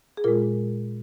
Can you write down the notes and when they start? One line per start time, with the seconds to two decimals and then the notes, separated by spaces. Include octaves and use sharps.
0.17 G#4
0.24 A#2 G#3 F4 A#4